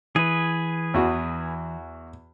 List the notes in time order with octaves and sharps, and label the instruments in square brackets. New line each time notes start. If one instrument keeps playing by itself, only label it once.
[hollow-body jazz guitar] E3 [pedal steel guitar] G#4 B4
[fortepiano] E2 F#4